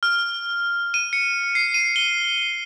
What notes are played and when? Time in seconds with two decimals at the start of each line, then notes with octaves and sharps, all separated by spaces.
0.03 F6
0.94 D#7
1.13 C#7
1.55 C7
1.74 D#7
1.96 G7